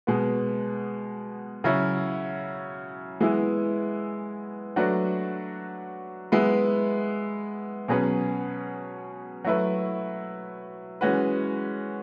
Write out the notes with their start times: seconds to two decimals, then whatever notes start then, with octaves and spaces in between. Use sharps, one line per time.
0.07 B2 G#3 B3
1.64 C#3 F#3 C#4 E4
3.20 E3 G#3 B3 E4
4.76 F#3 A3 D4 F#4 B4
6.32 G#3 B3 E4 B4
7.88 B2 F#3 C#4 G#4 B4
9.44 F#3 A3 E4 B4
11.01 E3 G#3 C#4 F#4 B4